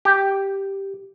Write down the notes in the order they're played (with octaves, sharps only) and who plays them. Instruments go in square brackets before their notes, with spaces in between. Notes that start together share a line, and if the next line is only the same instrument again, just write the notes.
[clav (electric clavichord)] G4